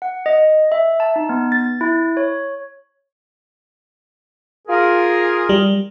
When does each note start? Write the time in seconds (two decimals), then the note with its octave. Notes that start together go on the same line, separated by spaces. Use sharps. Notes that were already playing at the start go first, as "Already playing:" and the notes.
0.02 F#5
0.26 D#5
0.72 E5
1.00 A5
1.16 D#4
1.29 B3
1.52 A6
1.81 E4
2.17 C#5
4.68 F4 G#4 A#4
5.49 G3